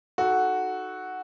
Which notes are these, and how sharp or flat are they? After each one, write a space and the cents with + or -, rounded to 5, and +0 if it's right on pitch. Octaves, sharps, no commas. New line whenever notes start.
D#4 +0 F#4 +0 A4 -15